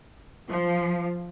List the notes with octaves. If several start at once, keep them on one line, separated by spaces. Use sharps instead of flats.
F3